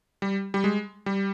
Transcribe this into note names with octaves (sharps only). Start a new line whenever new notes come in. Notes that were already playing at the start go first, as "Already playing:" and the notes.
G3
G3
G#3
G3